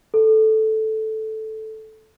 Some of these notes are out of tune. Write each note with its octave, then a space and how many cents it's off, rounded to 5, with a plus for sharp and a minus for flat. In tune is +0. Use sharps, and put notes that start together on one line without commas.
A4 -5